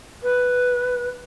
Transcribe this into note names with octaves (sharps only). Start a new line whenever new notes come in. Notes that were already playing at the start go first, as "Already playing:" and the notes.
B4